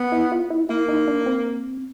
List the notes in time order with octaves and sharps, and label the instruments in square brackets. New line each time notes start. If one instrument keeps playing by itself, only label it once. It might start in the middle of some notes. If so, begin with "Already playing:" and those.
Already playing: [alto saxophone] B3
[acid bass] E4
F4
E4
[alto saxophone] A#3 [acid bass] E4
[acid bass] D#4
D4
C4